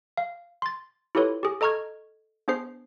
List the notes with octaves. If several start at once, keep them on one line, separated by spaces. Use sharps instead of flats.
F5
C6 A6
E4 F4 G4 A4 B4 C#5
G4 G#4
A4 D#5 A#5 C#6 F6 G#6
B3 D4 G#4 C5 C7